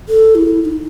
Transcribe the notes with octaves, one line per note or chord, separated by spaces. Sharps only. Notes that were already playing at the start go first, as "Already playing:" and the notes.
A4
E4
E4
D#4